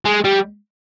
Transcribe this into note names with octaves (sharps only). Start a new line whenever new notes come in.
G#3
G3